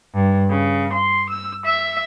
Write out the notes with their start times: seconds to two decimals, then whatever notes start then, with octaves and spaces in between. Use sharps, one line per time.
0.15 G2
0.51 C#3
0.93 C6
1.30 E6
1.66 E5